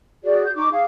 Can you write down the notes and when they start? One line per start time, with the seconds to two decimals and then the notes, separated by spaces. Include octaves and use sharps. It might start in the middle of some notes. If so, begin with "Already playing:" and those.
0.24 F#4 G#4 D5
0.45 G6
0.56 D#4 C#6 D6
0.71 G#4 F5